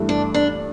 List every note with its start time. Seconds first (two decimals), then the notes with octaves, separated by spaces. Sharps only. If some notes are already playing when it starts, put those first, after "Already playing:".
Already playing: G2 E3 A3
0.09 D4
0.34 D4